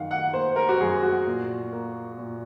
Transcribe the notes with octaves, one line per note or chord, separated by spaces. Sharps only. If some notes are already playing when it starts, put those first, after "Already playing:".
Already playing: F#2 D#3 F5 F#5
F#5
A#3 C5
A#4
F#4
F#2 G#4
F#4
A#2
A#3
A#2